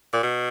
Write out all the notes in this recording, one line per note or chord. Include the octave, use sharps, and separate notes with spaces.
A#2
B2